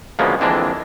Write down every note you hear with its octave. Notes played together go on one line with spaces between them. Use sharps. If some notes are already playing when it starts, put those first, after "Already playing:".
D2 C#3 F3 G#3 A#3 B3
F2 D3 E3 G#3 A#3 D4